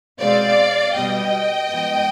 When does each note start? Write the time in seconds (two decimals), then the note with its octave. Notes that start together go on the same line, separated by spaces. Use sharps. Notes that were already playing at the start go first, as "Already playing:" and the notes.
0.19 B2 G#3 C4 D5 F5
0.94 B2 G3 B3 D#5 G5
1.69 G#2 F3 B3